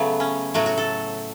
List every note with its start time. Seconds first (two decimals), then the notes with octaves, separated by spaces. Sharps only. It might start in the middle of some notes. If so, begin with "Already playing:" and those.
Already playing: C#3 F#3 A3 B3
0.20 C#4
0.54 A2 F#3 A3 F#4
0.66 F#4
0.78 A4